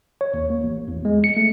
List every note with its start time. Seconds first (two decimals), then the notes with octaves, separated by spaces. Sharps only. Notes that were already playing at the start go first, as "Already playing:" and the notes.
0.21 C#5
0.34 D#2
0.50 A#3
0.64 A1
0.88 E2
1.05 G#3
1.24 C#7
1.37 A3